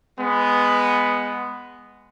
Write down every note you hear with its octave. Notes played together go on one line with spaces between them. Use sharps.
G#3 B3